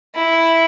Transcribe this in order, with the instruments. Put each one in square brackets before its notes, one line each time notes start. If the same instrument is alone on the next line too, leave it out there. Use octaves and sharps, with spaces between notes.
[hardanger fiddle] E4